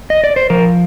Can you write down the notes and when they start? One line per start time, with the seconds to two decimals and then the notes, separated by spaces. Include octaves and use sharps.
0.10 D#5
0.24 D5
0.36 C5
0.50 F3 A#4